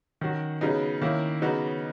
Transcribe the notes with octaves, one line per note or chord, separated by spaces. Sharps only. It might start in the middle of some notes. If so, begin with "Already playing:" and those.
D#3 F#3 C#4 F#4
C#3 F#3 B3 D#4
D#3 A#3 C#4 E4
C#3 F#3 B3 D#4 F#4